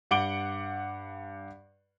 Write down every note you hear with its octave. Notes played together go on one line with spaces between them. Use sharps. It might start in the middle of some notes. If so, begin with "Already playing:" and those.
G2 F#5 D6 D7 G7